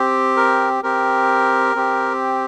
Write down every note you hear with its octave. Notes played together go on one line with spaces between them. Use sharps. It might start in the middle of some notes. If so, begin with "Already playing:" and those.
Already playing: C4 G4
A#4
C4 G4 A#4
C4 G4